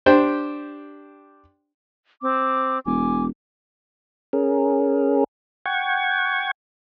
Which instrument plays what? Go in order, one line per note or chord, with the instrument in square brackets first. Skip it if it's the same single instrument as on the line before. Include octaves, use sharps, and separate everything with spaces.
[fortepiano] D4 G4 C5 G5
[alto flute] C4 [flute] D6
[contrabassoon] E1 [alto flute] G#5 [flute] D6
[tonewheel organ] C#4 G#4 A#4
F#5 G5 C#6 G#6